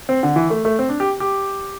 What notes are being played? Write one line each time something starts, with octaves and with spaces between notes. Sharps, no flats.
C4
D3
E3
A3
A3
C4
D4
G4
G4